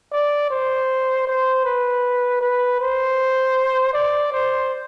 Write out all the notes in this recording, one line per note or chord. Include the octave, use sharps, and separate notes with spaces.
D5
C5
C5
B4
B4
C5
D5
C5